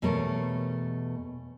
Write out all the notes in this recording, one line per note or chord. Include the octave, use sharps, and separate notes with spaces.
E2 B2 G3 A3 A#4 C#5